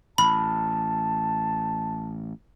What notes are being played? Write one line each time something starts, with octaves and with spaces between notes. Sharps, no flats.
A1 A5 B5